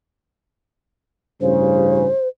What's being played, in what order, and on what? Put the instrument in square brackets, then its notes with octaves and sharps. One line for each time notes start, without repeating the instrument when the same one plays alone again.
[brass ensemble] A1 G2 C#3 [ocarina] C5